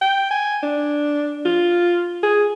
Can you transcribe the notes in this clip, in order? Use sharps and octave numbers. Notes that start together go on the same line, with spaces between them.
G5
G#5
D4
F4
G#4